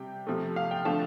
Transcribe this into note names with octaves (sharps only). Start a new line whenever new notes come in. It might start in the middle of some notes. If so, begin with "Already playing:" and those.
Already playing: C3 G3 G5
C3 F3 A3
F5
G5
D3 F3 A3 F5 A5